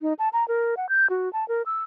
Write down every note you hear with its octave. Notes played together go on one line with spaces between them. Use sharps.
D#4
A5
A#5
A#4
F#5
G6
F#4
A5
A#4
E6